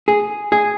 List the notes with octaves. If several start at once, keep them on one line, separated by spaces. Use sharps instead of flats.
G#4
G#4